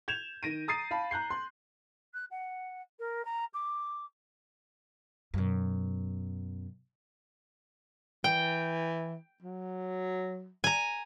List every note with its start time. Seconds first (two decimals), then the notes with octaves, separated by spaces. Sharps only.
0.08 G6 G#6 E7 F7
0.43 D#3 A#6 D7 D#7
0.68 A#5 D#6 A6 C7 D#7
0.91 F5 A5 B5
1.11 A#5 F#6 G6 C7
1.30 C6 F#6
2.14 F#6
2.30 F#5
2.99 A#4
3.25 A#5
3.53 D6
5.34 F#2 B2
8.24 E3 G5
9.42 F#3
10.64 G#5 A#5